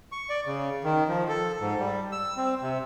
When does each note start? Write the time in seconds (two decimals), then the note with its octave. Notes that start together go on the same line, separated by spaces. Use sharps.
0.12 C#6
0.30 D5
0.46 C#3
0.84 D#3
1.09 F3
1.29 A4
1.60 G#2
1.79 G3
2.12 E6
2.37 C4
2.62 C3